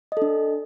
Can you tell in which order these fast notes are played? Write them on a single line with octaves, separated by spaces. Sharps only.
D#5 A4 D4